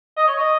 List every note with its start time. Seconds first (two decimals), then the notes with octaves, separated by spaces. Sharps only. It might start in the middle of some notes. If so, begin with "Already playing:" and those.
0.17 D#5
0.28 C#5
0.39 D#5